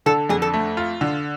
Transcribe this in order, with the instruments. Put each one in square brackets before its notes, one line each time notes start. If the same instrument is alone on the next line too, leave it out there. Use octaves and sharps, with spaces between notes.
[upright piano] D3 [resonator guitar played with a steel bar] A4
[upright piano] F2 [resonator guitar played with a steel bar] G#4
[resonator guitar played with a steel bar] A4
[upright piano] A3
F4
D3